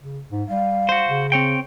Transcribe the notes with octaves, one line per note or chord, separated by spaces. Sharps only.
C#3
G#2
G3 F5
F#4 C5
C#3
C4 C#5 G5